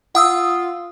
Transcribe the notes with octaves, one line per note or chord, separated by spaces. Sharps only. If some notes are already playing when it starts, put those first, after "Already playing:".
F4 F#5 D#6 E6